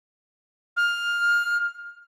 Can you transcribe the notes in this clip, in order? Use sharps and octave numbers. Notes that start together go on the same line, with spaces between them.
F6